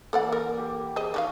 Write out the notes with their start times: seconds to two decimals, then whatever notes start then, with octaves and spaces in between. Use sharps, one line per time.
0.13 E3 A#3 A4 D5 F#5
0.32 A#4
0.58 G4
0.96 G#4 C5 D#5
1.14 D#3 D4 F5 C#6